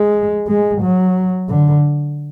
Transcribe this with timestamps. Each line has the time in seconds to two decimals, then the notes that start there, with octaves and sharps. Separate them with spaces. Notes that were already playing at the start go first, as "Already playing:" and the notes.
Already playing: G#3
0.48 G#3
0.81 F#3
1.49 D3